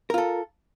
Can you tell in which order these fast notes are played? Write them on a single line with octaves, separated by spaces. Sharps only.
A#4 F4 A4